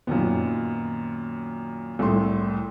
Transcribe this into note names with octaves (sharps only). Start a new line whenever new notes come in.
F#2 A#2 D#3 B3
C2 A2 A3 C6